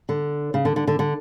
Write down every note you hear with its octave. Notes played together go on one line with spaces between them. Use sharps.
D3
C#3
D3
D3
D3
D3